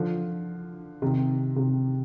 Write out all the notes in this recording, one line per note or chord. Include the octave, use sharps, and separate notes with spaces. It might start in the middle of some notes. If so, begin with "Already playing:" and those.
Already playing: D3 F3
C3 D#3
C3